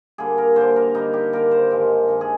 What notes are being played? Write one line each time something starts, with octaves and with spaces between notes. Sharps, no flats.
D3 G3 A#3 G#4
A#4
D3 G3 A#3 C5
A#4
D3 G3 A#3 D#4
G4
D3 G3 A#3 A#4
C5
G2 D#3 G#3
G2 D#3 G#3
G#4